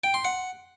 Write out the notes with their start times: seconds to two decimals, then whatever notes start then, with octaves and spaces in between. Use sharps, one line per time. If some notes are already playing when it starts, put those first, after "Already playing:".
0.04 G5
0.14 C6
0.25 F#5